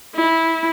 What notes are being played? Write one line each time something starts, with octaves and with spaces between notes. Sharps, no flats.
E4